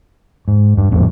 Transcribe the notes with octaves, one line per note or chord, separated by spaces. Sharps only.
G#2
G2
A#1 F2 A2